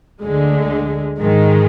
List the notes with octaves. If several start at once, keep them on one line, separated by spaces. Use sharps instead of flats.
D2 D3 G#3
G#2 D#3 G#3